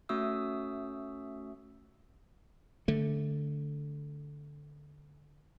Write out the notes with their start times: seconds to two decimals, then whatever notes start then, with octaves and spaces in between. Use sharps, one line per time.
0.09 A3 C#4 F#4 E5 D#6 E6
2.88 D3 A3